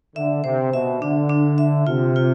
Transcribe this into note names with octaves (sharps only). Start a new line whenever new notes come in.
D3 E5
C3 C5
B2 E5
D3 D4
D4
E5
C3 F4
F4